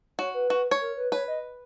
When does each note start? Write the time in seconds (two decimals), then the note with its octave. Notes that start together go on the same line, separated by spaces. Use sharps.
0.18 F#4 C#5
0.34 B4
0.50 F#4
0.71 C#5
0.81 A#4
0.97 B4
1.12 B4 C#5
1.28 D#5